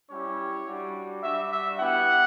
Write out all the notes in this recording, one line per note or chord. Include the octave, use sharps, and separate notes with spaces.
G3 C#4 E4 G4 C#5
G3 D4 F#4
G3 D4 F#4 E5
E5
B3 E4 G4 F#5